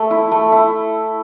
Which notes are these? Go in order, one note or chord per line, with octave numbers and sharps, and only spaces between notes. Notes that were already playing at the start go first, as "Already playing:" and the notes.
Already playing: A3 E5
E4
A3
E4